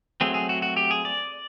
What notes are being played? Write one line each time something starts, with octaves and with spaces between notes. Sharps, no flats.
F#3 A3 C4 G#4
G#4
F#4
F#4
G4
G#4
D5